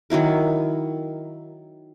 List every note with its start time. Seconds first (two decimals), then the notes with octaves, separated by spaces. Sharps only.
0.10 D#3 F#3 E4 A#4